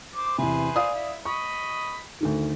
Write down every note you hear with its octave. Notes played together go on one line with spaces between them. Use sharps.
C5 D6
E2 C3 G#4 B4 C5
D5 F5 D#6
E4
D#5 B5 C#6 D#6
D2 D3 D#3